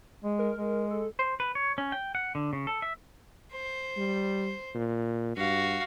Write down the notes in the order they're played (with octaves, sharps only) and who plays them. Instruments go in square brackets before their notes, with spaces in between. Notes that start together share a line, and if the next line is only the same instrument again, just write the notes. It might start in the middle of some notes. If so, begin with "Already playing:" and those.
[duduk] G#3
[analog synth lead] A#4
[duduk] G#3
[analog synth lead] A4
[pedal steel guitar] C5
B4
C#5
C#4
G5
F#5
D3
C#3
A4
E5
[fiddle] C5
[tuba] G3
A#2
[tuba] G2 [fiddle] F#4 F5